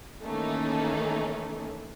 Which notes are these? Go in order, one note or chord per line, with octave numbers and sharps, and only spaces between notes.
D#3 E3 A3 A#3 C#4 D#4